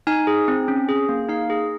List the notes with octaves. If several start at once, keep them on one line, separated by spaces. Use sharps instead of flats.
D#4 G#5
G#4
C4
C#4
G#4
A#3
D#4 F5
G#4